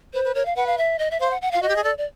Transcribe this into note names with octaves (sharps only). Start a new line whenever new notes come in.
B4 C5
B4
A#4 C#5
F5
B4 F#5
F5
E5
D#5
E5
C5 F5
F#5
F#5
F4 F5
F#4 D#5
G4
G#4
A4 D5
D5